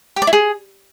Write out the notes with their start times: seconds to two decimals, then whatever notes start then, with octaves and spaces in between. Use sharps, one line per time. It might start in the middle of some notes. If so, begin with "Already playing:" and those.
0.16 G4
0.22 D5
0.27 E4
0.33 G#4